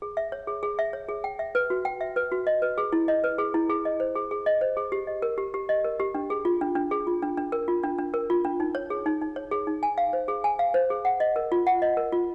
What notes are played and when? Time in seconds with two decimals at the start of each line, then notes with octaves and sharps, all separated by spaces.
0.02 G#4
0.17 E5
0.32 C#5
0.47 G#4
0.63 G#4
0.79 E5
0.93 C#5
1.09 G#4
1.24 G5
1.39 E5
1.55 B4
1.70 F#4
1.85 G5
2.01 E5
2.16 B4
2.32 F#4
2.47 D#5
2.62 B4
2.78 G#4
2.93 E4
3.08 D#5
3.24 B4
3.38 G#4
3.54 E4
3.70 G#4
3.85 D#5
4.00 C5
4.15 G#4
4.31 G#4
4.46 D#5
4.61 C5
4.77 G#4
4.92 G4
5.07 D#5
5.22 A#4
5.38 G4
5.54 G4
5.69 D#5
5.84 A#4
6.00 G4
6.15 D4
6.30 G#4
6.45 F4
6.61 D4
6.75 D4
6.91 G#4
7.07 F4
7.22 D4
7.37 D4
7.52 A#4
7.68 F4
7.83 D4
7.98 D4
8.14 A#4
8.30 F4
8.44 D4
8.60 D#4
8.75 C#5
8.90 G#4
9.06 D#4
9.21 D#4
9.36 C#5
9.51 G#4
9.67 D#4
9.83 G#5
9.98 F5
10.13 C5
10.28 G#4
10.44 G#5
10.59 F5
10.74 C5
10.90 G#4
11.05 F#5
11.20 D#5
11.36 A#4
11.52 F4
11.67 F#5
11.82 D#5
11.97 A#4
12.12 F4